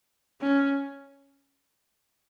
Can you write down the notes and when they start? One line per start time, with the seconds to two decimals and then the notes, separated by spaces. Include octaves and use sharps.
0.41 C#4